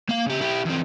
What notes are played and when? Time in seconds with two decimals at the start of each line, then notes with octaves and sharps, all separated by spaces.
0.09 A#3 F5
0.26 C#3 G4
0.40 E4 G4
0.65 E2 C4